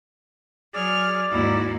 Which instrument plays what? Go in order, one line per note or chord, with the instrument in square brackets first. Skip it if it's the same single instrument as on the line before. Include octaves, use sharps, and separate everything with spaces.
[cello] F#3 [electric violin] G#4 F6 [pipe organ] D5
[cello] D#2 G#2 [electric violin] E4 F#4